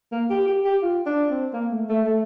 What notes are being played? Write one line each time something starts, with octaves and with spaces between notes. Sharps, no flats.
A#3
G4
G4
G4
F4
D4
C4
A#3
A3
A3
A3